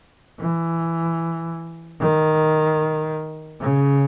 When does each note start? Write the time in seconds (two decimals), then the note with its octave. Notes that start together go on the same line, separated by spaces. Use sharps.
0.40 E3
2.00 D#3
3.60 C#3